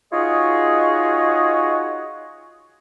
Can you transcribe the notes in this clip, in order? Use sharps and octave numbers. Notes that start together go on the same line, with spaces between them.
D#4 F4 F#4 G#4 C#5 D#5